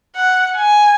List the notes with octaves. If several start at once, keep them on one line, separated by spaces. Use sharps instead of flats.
F#5
G#5